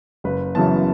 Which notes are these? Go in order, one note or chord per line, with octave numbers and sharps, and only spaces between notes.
F#1 B4
F#2 C#3 E3 B3 A5